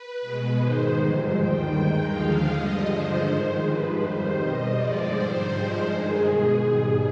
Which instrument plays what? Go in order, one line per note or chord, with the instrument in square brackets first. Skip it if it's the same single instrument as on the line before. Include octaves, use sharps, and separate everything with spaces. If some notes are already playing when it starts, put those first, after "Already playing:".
Already playing: [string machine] B4
B2 G#3
G#2 D#3 G#3 C5
G2 D3 F3 G#3 C5
D#2 D#3 G3 G5
G2 D#3 G#3 G5
D#2 D3 F3 G#3 F5
G2 D3 G3 D#5
G2 D3 F3 G#3 C5
G#2 D#3 G#3
G2 F3 G#3 B4
F2 D#3 G3 C5
B2 G3 D#5
G2 D3 F3 G#3 D5
G#2 G3 C5
G2 F3 G#3
G2 D#3 G#3 G#4
B2 G#3 G#4
G#2 G3